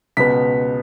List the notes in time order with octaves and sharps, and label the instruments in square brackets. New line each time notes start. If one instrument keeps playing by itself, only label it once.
[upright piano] C#2 B2 B3 B6